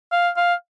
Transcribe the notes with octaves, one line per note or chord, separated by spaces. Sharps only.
F5
F5